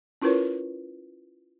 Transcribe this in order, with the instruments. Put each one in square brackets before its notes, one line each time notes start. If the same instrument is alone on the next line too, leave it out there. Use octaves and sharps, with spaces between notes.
[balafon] C#4 E4 F4 A#4 B4 C#5